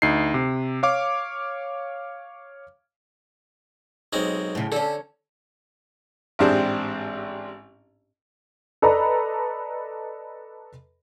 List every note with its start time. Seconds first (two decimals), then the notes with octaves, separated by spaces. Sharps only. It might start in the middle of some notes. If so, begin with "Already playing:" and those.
0.02 D2 D#4 C7
0.34 C3
0.83 C#5 F5 D6
4.13 B1 G#3 C4
4.55 A2 C#3
4.72 D3 C#4 A4
6.39 A1 G#2 C4 D4 G4 G#4
8.82 A4 B4 D5 D#5 A#5 B5